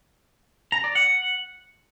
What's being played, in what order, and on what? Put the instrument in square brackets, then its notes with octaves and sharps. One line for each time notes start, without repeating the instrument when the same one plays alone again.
[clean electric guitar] A#5
D5
F#5